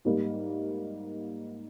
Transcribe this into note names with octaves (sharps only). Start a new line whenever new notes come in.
G#2 G3 A#3